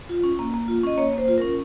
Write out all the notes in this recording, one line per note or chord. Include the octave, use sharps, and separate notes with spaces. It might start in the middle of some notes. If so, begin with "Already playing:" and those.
F4
C#4
A#3
A#3
F4
C#4 D#5
A#3 C#5
A#3 C5
F4
A#4
C#4